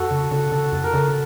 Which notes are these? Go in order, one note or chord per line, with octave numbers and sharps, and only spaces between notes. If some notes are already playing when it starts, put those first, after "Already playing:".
Already playing: F2 F#4 A4
C#3
C#3 A4
C#3 A4
F2 A4
A#4
C#3 A4